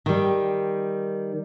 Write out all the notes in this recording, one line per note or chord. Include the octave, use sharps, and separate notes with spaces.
D#3 G3